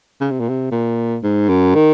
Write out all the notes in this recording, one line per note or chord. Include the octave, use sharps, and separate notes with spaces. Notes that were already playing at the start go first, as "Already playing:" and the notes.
C#3
C3
A#2
C3
A#2
G#2
F#2
D#3